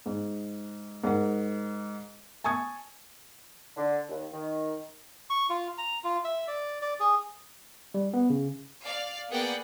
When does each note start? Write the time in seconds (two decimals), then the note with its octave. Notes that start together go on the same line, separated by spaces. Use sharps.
0.06 G#2
1.04 G#2 A#4 F#5
2.44 G#5 A5 C#6 D#6 G#6
3.76 D3
4.09 D#2
4.33 D#3
5.30 C#6
5.50 F4
5.78 A#5
6.04 F4
6.24 E5
6.48 D5
6.82 D5
7.00 G#4
7.94 G3
8.14 B3
8.30 C#3
8.84 D5 F5
9.30 A#3 B3 G#4 D5 F#5 G5